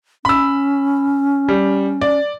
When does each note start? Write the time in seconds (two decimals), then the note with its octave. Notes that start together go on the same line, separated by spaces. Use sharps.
0.25 C#4 B5 E6
1.49 G3
2.01 D5